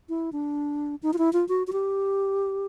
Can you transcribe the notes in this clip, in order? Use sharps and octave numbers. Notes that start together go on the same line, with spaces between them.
E4
D4
D#4
F4
E4
F4
F#4
F#4
G4